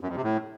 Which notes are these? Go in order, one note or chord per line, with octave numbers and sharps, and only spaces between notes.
F#2
F2
C3
A2